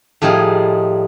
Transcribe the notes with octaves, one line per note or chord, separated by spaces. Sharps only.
A2 F3 G3 D#4 F4 G#4